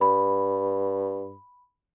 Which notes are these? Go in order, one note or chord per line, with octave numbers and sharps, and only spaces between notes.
G2 B5